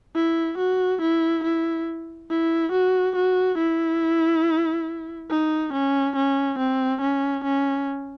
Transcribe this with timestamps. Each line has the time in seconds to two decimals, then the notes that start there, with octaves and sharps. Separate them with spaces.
0.16 E4
0.58 F#4
1.02 E4
1.44 E4
2.30 E4
2.73 F#4
3.16 F#4
3.58 E4
5.30 D#4
5.74 C#4
6.16 C#4
6.59 C4
7.01 C#4
7.44 C#4